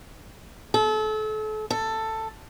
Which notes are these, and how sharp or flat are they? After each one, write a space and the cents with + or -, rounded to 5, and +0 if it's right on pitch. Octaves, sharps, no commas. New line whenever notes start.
A4 -35
A4 +10